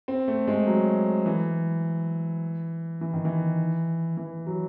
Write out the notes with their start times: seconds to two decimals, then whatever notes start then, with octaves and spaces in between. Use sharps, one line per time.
0.08 C4
0.28 A3
0.47 G#3
0.67 F#3
1.26 E3
3.01 E3
3.13 D#3
3.25 E3
4.17 E3
4.47 F#3